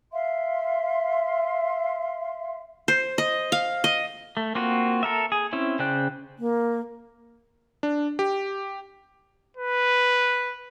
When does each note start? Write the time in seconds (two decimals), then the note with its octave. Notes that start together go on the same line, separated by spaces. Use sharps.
0.12 E5 F5 C6
2.88 C5
3.18 D#5
3.52 F5
3.84 D#5
4.37 A3
4.55 A#3 C4 F4 F#4
5.03 A4 A#4 E5
5.32 G#4
5.53 C4 C#4 E4
5.79 C#3 C5 D5 G5 F#6
6.39 A#3
7.83 D4
8.19 G4
9.57 B4